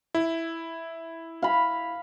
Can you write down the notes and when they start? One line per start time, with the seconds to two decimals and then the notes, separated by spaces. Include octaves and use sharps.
0.15 E4
1.42 F5 B5